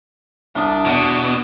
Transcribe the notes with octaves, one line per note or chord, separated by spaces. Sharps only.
C2 D4 D#6
E2 B2